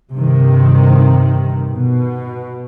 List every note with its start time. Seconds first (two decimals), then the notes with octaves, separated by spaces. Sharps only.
0.14 G2 C3 D#3
1.72 B2